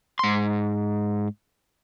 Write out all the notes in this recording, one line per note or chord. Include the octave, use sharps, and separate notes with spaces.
G#2 C6